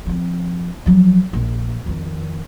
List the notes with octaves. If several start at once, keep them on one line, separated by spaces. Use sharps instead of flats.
F3 C4
F3 F#3
A#1
F2 D#3